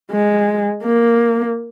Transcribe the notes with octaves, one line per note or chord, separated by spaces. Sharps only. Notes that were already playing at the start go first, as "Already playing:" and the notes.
G#3
A#3